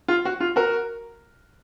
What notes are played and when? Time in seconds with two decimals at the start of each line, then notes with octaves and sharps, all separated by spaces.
0.08 F4
0.25 F#4
0.40 F4
0.56 F#4 A#4